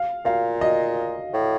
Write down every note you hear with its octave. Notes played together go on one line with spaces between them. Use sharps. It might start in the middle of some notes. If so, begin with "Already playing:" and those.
Already playing: F5
A#2 F5
D#5
A2